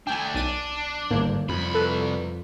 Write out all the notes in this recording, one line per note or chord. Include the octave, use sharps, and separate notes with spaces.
A3 D4 G5 G#5
B1 D4 A6 D#7
G1 G#2 A#3
C2 F2 B5
A4 B4